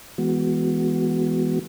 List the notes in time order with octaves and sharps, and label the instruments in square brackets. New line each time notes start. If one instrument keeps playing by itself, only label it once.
[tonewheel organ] E3 G#3 B3 F#4